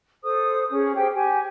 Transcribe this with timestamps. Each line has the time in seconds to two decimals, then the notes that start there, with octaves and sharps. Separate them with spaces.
0.24 A4 C5 D#6
0.71 C#4 G#4
0.95 G4 G#4 C5 G5
1.14 G4 G#5